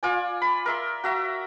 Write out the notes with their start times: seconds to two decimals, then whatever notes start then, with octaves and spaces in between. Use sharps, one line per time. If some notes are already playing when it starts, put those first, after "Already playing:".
0.03 F4 D5 G#5
0.42 B5
0.66 A#4 E5 C6
1.04 F#4 E5 A#5